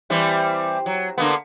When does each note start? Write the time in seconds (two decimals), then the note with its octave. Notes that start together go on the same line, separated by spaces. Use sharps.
0.10 E3 G3 C4
0.86 F#3
1.18 D3 A#3 B3